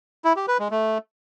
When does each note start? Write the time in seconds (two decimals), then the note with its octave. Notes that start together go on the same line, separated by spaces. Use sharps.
0.25 E4
0.36 G4
0.48 B4
0.60 G#3
0.71 A3